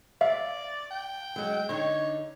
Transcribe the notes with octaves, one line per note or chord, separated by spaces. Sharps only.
D5 E5 F5
G5
F#3 G#3
D3 D#4 C#5